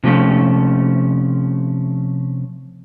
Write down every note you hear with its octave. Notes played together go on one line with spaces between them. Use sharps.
C3 F3 A3 C#4